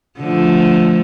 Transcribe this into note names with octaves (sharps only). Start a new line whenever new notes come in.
D3 F3 A3